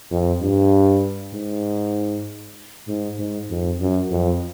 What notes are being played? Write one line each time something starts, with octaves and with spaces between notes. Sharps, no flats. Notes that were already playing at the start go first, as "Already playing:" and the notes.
F2
G2
G#2
G#2
G#2
F2
F#2
F2